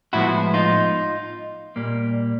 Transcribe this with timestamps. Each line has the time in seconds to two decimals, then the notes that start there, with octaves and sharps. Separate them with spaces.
0.13 A2 F3 G#3 B3 E4 F#4
0.54 D#4 F4
1.76 A#2 G3 A#3